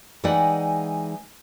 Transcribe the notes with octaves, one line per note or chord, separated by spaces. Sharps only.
E3 G#3 D#4 D5 F#5 G5